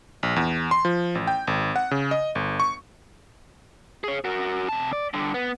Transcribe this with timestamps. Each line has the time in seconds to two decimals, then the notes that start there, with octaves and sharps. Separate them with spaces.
0.23 A#1
0.36 E2
0.71 C6
0.85 F3
1.15 A1
1.27 G5
1.47 G#1
1.76 F#5
1.91 C#3
2.11 D#5
2.35 G1
2.60 C#6
4.04 G#4 C#5
4.25 F#4 A#4
4.69 C3 A5
4.93 D5
5.14 G2 D3
5.34 B3